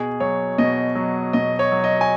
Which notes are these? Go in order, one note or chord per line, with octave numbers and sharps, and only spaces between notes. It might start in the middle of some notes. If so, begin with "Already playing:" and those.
Already playing: B2 G#4
F#3 C#5
B2 D#5
F#3
B2 D#5
C#5
F#3
D#5
G#5